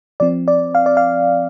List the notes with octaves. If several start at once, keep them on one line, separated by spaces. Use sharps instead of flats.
F3 C4 D5
D5
F5
D5
F5